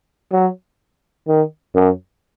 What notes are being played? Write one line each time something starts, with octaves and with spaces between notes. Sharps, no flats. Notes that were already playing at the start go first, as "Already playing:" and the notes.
F#3
D#3
F#2